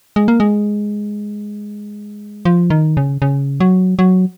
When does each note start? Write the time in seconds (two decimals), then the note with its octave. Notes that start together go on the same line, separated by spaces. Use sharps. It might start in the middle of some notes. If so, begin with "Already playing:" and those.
0.16 G#3
0.28 A#3
0.40 G#3
2.45 F3
2.70 D#3
2.97 C#3
3.22 C#3
3.60 F#3
3.99 F#3